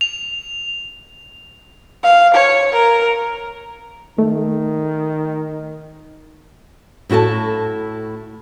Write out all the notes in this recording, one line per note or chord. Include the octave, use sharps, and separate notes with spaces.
F7
F5
C#5
A#4
D#3 A3
A2 E4 F#4 A4 A5